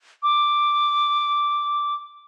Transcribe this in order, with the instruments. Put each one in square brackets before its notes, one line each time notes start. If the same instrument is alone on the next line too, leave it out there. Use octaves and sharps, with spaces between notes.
[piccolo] D6